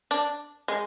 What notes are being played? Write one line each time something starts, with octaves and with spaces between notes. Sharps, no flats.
D4
G#3